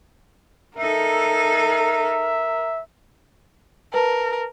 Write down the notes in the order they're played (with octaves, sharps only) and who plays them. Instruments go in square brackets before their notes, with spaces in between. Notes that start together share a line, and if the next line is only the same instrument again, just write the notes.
[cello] D#4 A4 [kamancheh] A#4 [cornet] E5
[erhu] A#4 [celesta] B4 A5